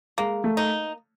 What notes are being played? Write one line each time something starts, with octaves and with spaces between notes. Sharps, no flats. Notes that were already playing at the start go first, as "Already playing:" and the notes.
G#3 A#3
A3
D#4